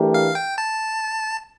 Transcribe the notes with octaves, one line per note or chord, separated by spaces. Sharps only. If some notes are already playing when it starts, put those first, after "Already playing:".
Already playing: E3 A3 D4 G4 A#4
F5
G5
A5